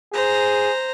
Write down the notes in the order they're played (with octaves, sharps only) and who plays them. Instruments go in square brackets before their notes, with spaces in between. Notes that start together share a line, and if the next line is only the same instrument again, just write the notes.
[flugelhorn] G#4 [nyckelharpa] C5 A#5